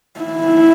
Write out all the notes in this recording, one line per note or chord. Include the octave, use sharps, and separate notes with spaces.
E4